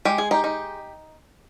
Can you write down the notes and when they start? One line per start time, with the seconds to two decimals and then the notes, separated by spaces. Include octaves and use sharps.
0.05 G#3 G4
0.18 G#4
0.31 D#4 G4
0.44 D#4